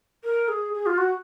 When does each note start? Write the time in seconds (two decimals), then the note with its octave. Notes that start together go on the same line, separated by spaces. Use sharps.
0.24 A#4
0.48 G#4
0.73 G#4
0.86 F4
0.98 F#4